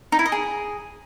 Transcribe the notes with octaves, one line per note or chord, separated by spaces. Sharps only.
D#4
E4
D#5
G#4